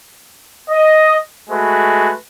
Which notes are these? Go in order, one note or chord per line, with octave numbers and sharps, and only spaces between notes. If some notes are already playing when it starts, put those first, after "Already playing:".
D#5
G#3 A3 F#4 B4